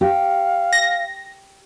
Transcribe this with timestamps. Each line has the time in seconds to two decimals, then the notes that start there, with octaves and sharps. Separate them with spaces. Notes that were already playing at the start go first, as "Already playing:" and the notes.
0.01 G4 F5
0.73 A#6